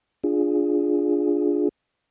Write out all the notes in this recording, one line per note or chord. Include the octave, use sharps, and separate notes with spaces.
D4 F4 G#4